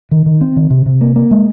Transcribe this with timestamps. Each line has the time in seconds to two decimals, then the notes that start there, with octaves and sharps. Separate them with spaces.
0.11 D#3
0.26 D#3
0.41 C4
0.56 D#3
0.70 C3
0.86 C3
1.01 A#3
1.16 A#3
1.31 G#3